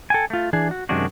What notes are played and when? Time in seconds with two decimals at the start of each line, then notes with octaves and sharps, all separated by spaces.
0.10 A4 G5 G#5
0.30 A3 F4
0.53 E3 D4 G#4
0.71 F#4
0.89 F#2 C3 D#3 G#3 D4 F#4